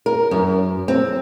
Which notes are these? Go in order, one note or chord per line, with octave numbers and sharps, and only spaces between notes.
A#4
F#2
C4